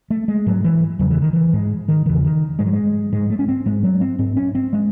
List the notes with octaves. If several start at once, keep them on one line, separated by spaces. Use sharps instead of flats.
A3
G#3
G#2 F#3
E3
E2 C#3 F#3
E3
D#3
E3
G#2 G#3
D#3
E2 C#3 E3
D#3
G#2 G#3
F#3
G#3
G#2 G#3
A3
C#4
C4
G#2 G#3
F#3
C4
G#2 C4
C#4
C4
G#3